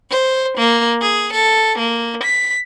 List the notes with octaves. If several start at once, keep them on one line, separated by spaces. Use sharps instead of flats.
C5
A#3
G#4
A4
A#3
B6